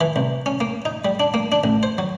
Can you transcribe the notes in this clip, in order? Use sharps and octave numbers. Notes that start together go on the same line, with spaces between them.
E3
C2
C#4
A#3
D#4
G3
D4
A#3
D4
A1
C5
F#3